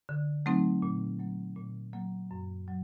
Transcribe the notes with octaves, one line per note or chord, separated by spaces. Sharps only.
D3
F#3 A3 C4 D#4
A#2
F#3 A#3
A#2
F#3 A#3
F#2
F#3